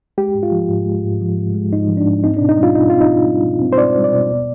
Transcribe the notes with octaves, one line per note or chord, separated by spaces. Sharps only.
G#3 G4
G#2
F4
F3
G#2
G#3
G#2
F3
G#2
G#3
G#2 D#4
F3
D4
G#2
C4 D#4
D4
B2
D#4
G3
F4
B2 D#4
C4 F4
D#4
B2
G3
B2
C4
C5
B2 D5
G3
D5
B2
B3